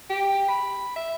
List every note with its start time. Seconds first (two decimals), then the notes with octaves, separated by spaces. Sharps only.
0.10 G4
0.48 B5
0.96 E5